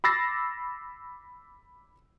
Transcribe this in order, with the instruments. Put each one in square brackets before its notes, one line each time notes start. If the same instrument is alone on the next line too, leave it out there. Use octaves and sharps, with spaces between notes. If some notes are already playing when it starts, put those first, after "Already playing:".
[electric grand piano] B5 D6 E6 A6 A#6 C7